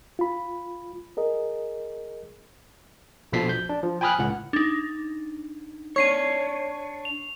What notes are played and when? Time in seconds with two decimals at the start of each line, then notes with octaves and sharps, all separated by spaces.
0.19 F4 B5
1.17 G#4 A#4 D#5
3.32 A#1 B2 F3 A4 B6 C7
3.49 G6
3.69 D4
3.83 F3
4.01 G5 G#5 B5 D#6 F6 F#6
4.19 C#2 A2 F#5
4.53 D4 D#4
5.96 D4 C#5 C#6 C7 D#7
7.05 F7